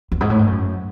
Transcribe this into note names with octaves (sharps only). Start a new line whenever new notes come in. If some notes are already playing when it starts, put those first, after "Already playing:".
E2
G#2
A2
G#2
F#2